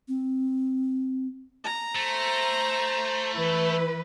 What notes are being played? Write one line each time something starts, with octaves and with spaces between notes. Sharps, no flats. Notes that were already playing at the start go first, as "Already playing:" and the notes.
C4
A#5
A3 C5
E3 E4 B4